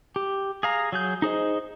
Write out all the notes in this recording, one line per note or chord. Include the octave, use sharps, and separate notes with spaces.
G4
G#4 F5 A#5
F#3 G#4 G6
D#4 G#4 C5 D#5